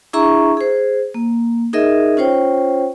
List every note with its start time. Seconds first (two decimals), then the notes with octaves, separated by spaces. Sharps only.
0.13 D4 E4 G#4 E5 A#5 C#6
0.57 G#4 C5
1.14 A#3
1.73 D#4 G#4 A#4 D#5 E5
2.17 C#4 F4 C5 C#5 G5